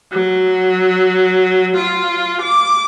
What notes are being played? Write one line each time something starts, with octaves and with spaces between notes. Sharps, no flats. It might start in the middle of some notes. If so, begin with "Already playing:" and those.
F#3
F4
D6